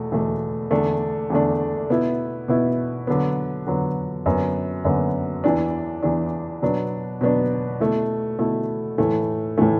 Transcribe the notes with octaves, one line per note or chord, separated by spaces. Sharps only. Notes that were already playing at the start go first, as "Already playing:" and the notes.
Already playing: E2 B2 A3
E2 B2 A3
E2 D3 A3 D4
E2 D3 A3 D4
B2 B3 E4
B2 B3 E4
D3 F#3 B3
D3 F#3 B3
F#2 D3 B3
F#2 D3 B3
E2 E3 D4
E2 E3 D4
B2 F#3 B3 D4
B2 F#3 B3 D4
B2 A3 E4
B2 A3 E4
A2 E3 A3
A2 E3 A3